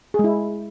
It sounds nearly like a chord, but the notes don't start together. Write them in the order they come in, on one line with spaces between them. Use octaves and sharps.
G#4 G#3 E4